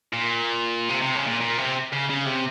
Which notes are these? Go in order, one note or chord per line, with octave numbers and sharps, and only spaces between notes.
A#2
C3
C3
C#3
A#2
A#2
C3
C#3
C#3
C3